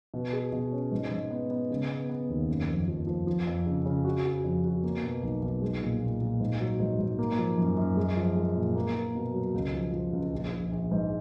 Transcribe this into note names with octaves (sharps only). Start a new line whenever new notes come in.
B2
G#4
B2
C#4
G#2
G#2
B3
B3
C#3
B3
B3
D#2
F#1
F2
F3
F3
F3
F2
C#3
C#3
F#4
F#4
F2
F#4
A#3
B2
B1
B1
G#3
A#2
A#2
A#2
G#2
F#3
G#2
G#2
A#3
F3
F#2
F#2
G#3
F3
G#3
A#2
A#3
A#3
B2
F#3
C#2
F3
F3
C#2
A#1
A#1
A#1
G#2